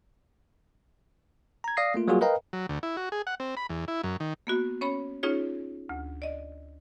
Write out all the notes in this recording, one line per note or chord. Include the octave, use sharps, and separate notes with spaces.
A#5 G#6
D5 F5 D#6 A#6 C7
A3 A#3 F4
F#3 G3 A#3 F4 F#4 G#4
A#4 B4 D#5 F5 G5 A#5
F#3
D2
E4
F#4
G#4
F#5
C4
B5
E2
E4
F#2
D#3
A#3 B3 F#4
C#4 C#5 B5
C#4 D#4 F4 G#4 C#5
D2
D5 D#5